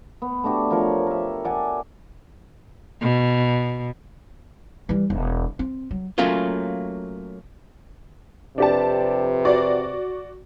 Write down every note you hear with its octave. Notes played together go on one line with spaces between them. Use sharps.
B3
A3 D4 F#4 G4
F3 A#4 C#5
A#4 E5
D5 F#5 G#5 A5
B2
E3 G3
E1
C4
F#3
F#3 A3 A#3 C#4 F4
F2 C3 D4 G4 B4 A5
F#4 D5